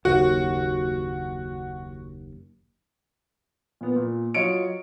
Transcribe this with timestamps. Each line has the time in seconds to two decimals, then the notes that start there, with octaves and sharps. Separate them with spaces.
0.05 F#1 D#2 F#4
3.81 A#2 B3
3.96 A#2
4.34 F#3 F4 C#5 D#5 C#7 D7